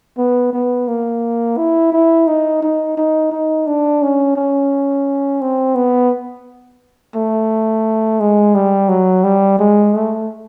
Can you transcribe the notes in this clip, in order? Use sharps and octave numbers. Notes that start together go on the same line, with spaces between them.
B3
B3
A#3
E4
E4
D#4
D#4
D#4
D#4
D4
C#4
C#4
C4
B3
A3
G#3
G3
F#3
G3
G#3
A3